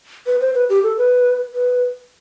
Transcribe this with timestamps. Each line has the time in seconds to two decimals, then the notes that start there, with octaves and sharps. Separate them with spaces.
0.26 B4
0.41 C5
0.55 B4
0.69 G4
0.83 A4
0.98 B4
1.54 B4